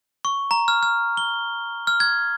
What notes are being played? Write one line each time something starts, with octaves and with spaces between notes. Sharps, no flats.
C#6
A#5
F6
F6
G7
F6
G#6